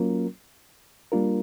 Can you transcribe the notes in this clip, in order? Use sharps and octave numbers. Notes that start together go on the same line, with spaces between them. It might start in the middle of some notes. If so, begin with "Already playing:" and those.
Already playing: F#3 A#3 C#4 F4 A#4
G3 A#3 D4 F4 A#4